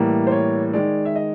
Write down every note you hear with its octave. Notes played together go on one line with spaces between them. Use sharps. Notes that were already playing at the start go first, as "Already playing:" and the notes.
Already playing: A2 E3 G3 A#3
C5
C#5
D#3 G#3 D5
E5
D#5